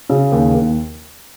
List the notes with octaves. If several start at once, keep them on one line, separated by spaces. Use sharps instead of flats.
C#3
D#2
D#2